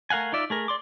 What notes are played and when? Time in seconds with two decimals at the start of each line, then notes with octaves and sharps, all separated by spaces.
0.10 A3 A#4 F5 F#5 G#5
0.32 D#4 F4 D5 E5
0.50 A3 G#4 A#4
0.68 D5 C6 D6